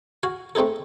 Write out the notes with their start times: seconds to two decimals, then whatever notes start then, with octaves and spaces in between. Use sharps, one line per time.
0.23 F#4 F5 G#5
0.55 A3 C4 D#4 G#4 A4